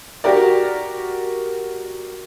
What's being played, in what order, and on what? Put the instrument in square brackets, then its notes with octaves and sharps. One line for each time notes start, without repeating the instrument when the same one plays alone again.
[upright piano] F#4 G4 A#4 D5